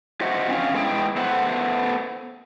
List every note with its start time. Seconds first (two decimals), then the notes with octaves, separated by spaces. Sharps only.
0.21 F4 F#4 C5 D#5 E5 F#5
0.49 C4 C#4 F5
0.74 G#3 B3 D4 E4 G5
1.16 A3 B3 C5 E5 F#5